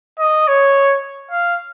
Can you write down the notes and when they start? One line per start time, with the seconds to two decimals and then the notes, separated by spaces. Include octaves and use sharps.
0.19 D#5
0.48 C#5
1.31 F5